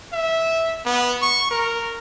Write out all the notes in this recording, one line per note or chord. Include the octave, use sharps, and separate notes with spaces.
E5
B3
C#6
A#4